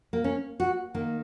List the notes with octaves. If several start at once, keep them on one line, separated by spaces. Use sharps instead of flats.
A#3
C#4
F#4
D#3 A#3